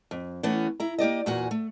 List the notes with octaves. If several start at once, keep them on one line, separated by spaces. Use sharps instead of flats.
F2
E3 A3 B3 C#4
E4 A#5
A#3 G4 D5 D#5
E2 A#2 F#4 F#5 G#5
A3